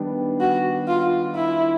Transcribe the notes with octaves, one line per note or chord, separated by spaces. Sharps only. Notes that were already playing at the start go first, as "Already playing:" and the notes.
Already playing: D#3 G3 B3 D4
F#4
F4
E4